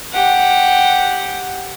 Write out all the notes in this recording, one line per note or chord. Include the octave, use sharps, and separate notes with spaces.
G4 F#5